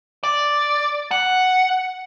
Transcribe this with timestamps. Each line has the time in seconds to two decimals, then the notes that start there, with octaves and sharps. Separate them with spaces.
0.24 D5
1.11 F#5